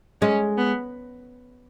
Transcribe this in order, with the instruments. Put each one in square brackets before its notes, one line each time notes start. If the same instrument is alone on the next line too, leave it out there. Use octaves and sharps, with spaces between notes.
[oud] G#3 [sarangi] C#4
[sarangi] B3